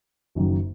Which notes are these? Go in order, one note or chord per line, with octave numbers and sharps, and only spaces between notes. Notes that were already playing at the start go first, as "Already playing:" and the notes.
F#1 F#2 D#3 F#3